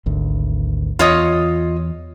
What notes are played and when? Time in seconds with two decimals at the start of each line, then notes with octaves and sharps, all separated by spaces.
0.06 G#1 D2
0.99 E2 F4 C#5 D#5